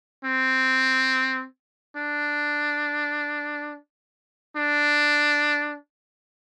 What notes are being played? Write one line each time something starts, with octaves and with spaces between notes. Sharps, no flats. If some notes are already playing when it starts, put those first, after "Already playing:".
C4
D4
D4